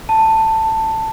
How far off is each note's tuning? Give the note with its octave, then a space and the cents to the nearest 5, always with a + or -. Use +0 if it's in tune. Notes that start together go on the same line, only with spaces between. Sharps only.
A5 +10